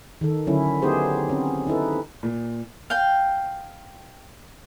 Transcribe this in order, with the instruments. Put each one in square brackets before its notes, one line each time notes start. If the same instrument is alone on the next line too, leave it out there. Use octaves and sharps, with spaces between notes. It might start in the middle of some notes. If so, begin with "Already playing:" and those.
[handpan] D#3 A4
D3 F#3 C#4 E4
B3 D#4 G4 G#4 C5
C4 C#4
D#4 E4 A4 B4
[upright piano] A#2
[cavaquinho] F5 G5